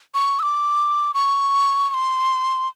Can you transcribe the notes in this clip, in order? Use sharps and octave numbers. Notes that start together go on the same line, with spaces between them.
C#6
E6
D6
C#6
C#6
C6